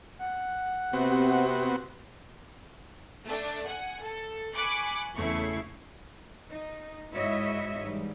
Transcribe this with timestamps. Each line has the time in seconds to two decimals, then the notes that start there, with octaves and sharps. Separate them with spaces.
0.19 F#5
0.93 C3 B3 C4 F#4
3.25 A3 D4
3.65 F#5 G#5
4.02 A4
4.54 G#5 B5 C#6 D6 F#6
5.14 E2 C#3 A3 E4 C#6 C7
6.50 D#4
7.13 G#2 E4 F#4 C#5 D#5 E5
7.78 G#2 E3 G3